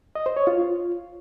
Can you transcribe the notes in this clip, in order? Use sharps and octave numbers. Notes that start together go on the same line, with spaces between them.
D#5
C5
C#5
F4